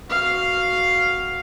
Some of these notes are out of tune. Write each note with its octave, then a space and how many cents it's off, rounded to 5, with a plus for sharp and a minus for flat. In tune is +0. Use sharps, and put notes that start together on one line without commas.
F#4 +0 F5 +0